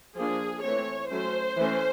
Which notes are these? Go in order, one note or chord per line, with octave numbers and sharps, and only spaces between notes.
F3 A#3 D4 G#4
E3 A3 C4 C#5
F#3 A3 C#4 C5
E3 A3 C#4